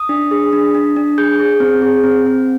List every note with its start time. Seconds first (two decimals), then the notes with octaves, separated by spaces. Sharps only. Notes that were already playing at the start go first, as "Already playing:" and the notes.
Already playing: D#6
0.09 D4
0.31 G#4
0.53 D4
0.75 D4
0.96 D4
1.18 G#4 G6
1.39 G#4
1.60 C4
1.82 G#4
2.04 C4
2.26 C4